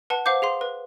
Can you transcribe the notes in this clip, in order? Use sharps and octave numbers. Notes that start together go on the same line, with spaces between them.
B4 F#5 A5
C5 F5 F#5 D6 G6
G#4 F5 C6
B4